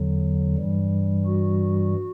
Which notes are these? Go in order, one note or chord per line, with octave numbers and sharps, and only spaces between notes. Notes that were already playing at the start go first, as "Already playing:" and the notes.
Already playing: E2 D3 F#3
G2 E3 G3
F#4